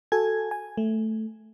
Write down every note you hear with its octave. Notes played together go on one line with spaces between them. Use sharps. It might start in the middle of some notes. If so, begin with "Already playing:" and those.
F#4 A4 G#5 G#6
G#5
A3